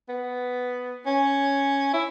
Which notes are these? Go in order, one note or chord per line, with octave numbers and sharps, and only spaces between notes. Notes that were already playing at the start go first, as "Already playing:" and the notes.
B3
C#4
E4